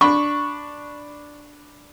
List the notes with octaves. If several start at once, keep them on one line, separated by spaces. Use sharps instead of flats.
D4 B5 C#6